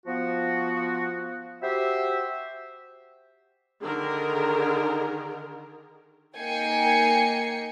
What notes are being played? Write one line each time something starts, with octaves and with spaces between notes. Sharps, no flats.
F3 B3 F#4
F#4 G4 C5 E5
D3 D#3 G#4 A#4
A#3 D#4 G5 G#5 C7 C#7